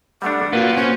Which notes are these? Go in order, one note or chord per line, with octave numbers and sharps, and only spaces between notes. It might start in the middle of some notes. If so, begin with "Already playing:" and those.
G3 A3 D4 F#5
A#2 A#3 F4 F#4 B4
C#4 C5